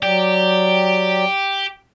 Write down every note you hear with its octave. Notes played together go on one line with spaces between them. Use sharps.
F#3 G4 D5